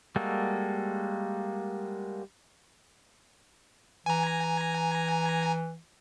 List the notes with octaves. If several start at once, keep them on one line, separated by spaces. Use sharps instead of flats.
G3 G#3 A#3 F#4 A4
E3 G#5 A#5